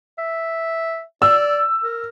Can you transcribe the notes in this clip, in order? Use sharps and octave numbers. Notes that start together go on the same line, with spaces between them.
E5
D5 E6
A#4